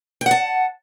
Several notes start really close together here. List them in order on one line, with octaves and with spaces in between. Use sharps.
G5 F#5 A5